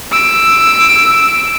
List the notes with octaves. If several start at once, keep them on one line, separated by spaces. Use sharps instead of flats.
E6 D7